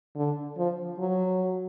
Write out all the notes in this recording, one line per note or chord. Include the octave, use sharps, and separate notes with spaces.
D3
F3
F#3